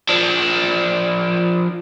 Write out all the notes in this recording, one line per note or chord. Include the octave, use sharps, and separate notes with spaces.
F3 D4